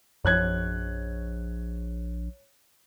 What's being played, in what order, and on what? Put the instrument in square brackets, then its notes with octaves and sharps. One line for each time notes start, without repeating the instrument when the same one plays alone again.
[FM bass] A#1 [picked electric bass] F#2 F3 [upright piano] C#5 F#6 G#6